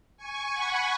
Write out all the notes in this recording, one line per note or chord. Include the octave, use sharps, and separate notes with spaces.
G#5 C#6
F#5 B5